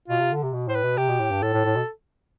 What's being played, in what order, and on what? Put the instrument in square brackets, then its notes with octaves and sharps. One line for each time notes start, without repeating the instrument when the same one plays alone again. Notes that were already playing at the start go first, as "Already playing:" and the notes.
[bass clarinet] B2 [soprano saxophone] F4
[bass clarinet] C3
D3
C3
B2
[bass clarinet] A2 [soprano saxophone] C5
[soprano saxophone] B4
[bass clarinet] B2
[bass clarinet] C3 [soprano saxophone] G4
[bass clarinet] B2
A2
G2
[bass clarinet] A2 [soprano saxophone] A4
[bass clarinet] A2
A2
B2